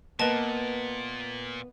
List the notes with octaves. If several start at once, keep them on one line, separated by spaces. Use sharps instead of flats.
A#2 A#3 B3 B4 D#5 A5